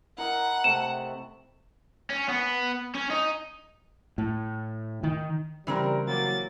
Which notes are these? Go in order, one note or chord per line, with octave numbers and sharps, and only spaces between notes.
E4 A#4 D#5 F#5
C3 A3 E7
C#4
B3
C#4
D#4
A2
D#3
C#3 E3 G3 C4 C#4 F#4 A#4
F#3 A#3 G4 C#5 D6 A6